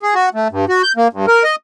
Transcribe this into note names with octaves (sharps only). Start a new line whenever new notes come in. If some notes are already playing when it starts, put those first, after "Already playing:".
G#4
F#4
A3
G2
F#4
G6
A#3
G2
A#4
D#5